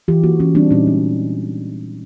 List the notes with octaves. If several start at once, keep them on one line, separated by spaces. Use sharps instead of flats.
E3 F4 G4
A#3 E4 F#4
E3 C#4
G3 C4 D4
A#2 C#4 D#4
G#3